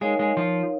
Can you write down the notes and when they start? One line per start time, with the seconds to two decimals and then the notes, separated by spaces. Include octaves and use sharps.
0.01 G#3 D#4 G#4 A#4 C#5 F5
0.19 G#3 G#4
0.37 F3 F4